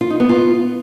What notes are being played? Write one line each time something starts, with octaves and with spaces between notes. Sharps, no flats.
F4
D#4
B3
F4